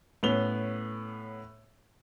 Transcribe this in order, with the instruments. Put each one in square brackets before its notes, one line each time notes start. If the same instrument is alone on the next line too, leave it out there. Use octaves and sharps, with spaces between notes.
[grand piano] A2 B3 C#4 F7 G7